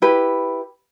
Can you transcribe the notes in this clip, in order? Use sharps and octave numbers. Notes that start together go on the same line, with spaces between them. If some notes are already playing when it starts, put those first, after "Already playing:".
E4 G4 B4